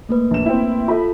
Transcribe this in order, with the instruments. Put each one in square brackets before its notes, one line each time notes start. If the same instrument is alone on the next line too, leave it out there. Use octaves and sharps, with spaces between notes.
[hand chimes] A3 A#3 B4
[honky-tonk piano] A#1 E7
C4 E4
[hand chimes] F4 A4 [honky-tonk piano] E5 B5